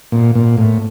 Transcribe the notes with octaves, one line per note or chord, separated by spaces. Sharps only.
A#2
A#2
A2